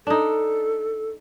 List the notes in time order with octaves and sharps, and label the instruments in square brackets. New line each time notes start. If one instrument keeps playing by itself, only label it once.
[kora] D4 D#4 [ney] A4